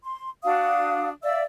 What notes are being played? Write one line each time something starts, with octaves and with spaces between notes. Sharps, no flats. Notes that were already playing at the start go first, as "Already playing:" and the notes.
C6
D4 F#4 F5 D#6
D5 E5 F5 E6